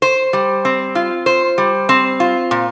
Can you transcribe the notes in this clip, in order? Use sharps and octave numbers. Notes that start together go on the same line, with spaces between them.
C5
G3
C4
F4
C5
G3
C4
F4
A#2